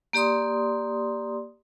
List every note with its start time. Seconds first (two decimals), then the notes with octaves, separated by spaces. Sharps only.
0.13 A#3 G4 D5 C6 D#6